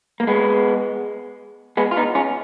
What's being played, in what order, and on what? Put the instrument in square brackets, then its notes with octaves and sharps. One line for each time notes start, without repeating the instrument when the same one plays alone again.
[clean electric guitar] A#3
G#3 B3
G#3 B3
F4
B3 D#4
C#4 F4